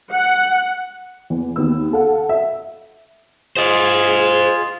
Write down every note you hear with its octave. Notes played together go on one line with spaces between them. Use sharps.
F#5
E2
D#2 B3 E6
A4 F5 F#5
E5
F4 G#4 C5 D#5